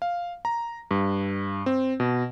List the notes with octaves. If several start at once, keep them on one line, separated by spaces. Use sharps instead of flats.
F5
A#5
G2
C4
B2